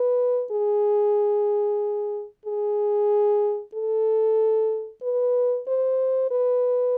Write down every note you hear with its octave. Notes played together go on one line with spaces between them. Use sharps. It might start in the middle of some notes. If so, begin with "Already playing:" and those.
Already playing: B4
G#4
G#4
A4
B4
C5
B4